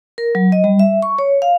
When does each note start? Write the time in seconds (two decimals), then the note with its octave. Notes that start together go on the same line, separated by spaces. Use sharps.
0.18 A#4
0.35 F#3
0.52 D#5
0.64 G3
0.79 E5
1.02 C#6
1.19 C#5
1.42 F5